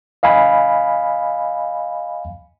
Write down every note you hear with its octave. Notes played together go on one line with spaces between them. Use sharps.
D#5 F5 G#5 B5